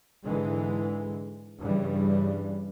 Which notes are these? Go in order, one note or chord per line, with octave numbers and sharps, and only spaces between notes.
G#2 D3 E3 G#3
G2 C#3 E3 G3